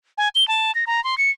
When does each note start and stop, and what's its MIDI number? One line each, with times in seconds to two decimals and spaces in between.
0.18 0.28 80
0.35 0.46 103
0.48 0.74 81
0.75 0.85 94
0.87 1.03 82
1.04 1.18 84
1.18 1.31 97